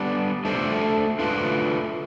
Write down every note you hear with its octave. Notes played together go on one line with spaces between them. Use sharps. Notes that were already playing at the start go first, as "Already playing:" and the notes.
Already playing: G3 B3 D4
A3 D4 A4 C5
A3 D4 F4 B4